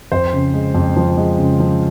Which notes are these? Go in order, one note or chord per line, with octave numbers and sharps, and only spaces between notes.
F2 C5
C#3
G#3
F2
F3
G#3
C#3
F3